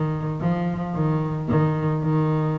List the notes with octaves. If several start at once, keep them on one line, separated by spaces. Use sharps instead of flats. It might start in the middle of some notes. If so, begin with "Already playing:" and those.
Already playing: D#3
F3
D#3
D#3
D#3